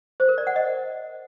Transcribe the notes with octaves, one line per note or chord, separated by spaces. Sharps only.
C5
A#4
D5
F#5
D#5